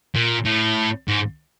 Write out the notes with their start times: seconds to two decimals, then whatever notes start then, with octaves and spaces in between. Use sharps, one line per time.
0.15 A#2
0.45 A2
1.08 G#2